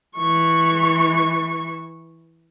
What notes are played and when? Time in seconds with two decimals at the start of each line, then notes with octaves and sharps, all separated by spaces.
0.16 E3 C#6